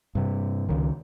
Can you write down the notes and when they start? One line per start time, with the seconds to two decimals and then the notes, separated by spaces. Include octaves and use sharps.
0.15 G2 C3
0.69 C#2 D#3